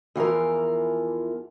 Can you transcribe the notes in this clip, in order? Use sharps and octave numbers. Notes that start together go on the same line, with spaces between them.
E2 E3 F3 A#4